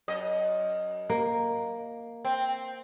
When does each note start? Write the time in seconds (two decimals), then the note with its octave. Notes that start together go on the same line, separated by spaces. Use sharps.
0.08 F#2 D#5
1.09 A#3
2.25 C4